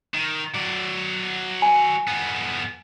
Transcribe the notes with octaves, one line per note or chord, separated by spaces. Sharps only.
D#3
F#3 D5
G#5
F2 B3